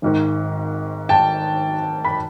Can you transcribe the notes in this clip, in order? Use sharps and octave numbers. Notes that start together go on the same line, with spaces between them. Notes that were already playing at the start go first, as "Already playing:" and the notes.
G#1 G#2 D#3
G5 A5
B5